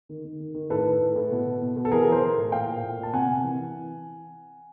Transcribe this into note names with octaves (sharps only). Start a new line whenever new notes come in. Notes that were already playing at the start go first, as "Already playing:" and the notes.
D#3
D#3
D#3
D#3
A2 A4 B4
A2
A2
A2
B2
B2
B2
B2
A4
E3 G#4 A#4
E3
A#4 C5
E3
A2
A#2 F5 G5
A#2
A#2
A#2
A5
C3 F#5 G#5
C3
E3
E3